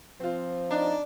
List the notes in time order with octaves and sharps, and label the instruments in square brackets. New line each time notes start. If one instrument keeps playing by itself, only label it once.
[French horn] F3 [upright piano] C4 F4
[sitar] D4 [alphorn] D#4